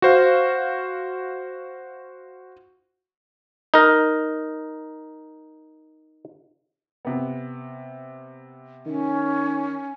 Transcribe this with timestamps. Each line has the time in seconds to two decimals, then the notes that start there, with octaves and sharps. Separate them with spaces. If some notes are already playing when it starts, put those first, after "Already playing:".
0.02 F#4 C5 F5
3.74 D#4 A#4
7.05 C3 B3
8.86 D#3 C#4